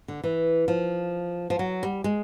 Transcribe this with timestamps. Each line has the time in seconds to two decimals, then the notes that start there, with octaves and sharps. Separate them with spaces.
0.08 D3
0.24 E3
0.68 F3
1.50 F3
1.59 F#3
1.83 G3
2.04 G#3